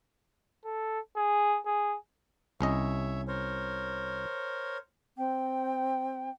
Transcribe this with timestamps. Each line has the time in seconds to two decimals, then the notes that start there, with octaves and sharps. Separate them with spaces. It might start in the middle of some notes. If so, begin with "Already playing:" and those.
0.65 A4
1.17 G#4
1.66 G#4
2.61 C2 C#4 C#5 D#5 E5
3.28 A#4 C5 C#5
5.17 C4 G5